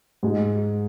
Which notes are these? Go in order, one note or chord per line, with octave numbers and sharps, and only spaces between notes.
G#2 G#3 D#4